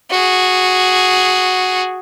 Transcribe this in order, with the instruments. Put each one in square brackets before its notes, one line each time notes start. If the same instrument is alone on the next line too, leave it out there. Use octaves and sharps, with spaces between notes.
[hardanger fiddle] F#4 G#4